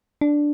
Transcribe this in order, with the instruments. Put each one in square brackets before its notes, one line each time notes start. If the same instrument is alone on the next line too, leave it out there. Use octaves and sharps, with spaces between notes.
[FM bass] D4